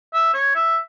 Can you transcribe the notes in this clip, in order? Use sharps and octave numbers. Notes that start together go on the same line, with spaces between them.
E5
C#5
E5